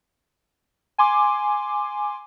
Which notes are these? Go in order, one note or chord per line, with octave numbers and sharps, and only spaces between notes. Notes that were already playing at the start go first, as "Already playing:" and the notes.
G#5 C6 D6